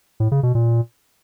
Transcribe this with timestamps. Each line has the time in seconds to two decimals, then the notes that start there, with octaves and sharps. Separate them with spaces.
0.20 A2
0.32 C#3
0.43 B2
0.55 A#2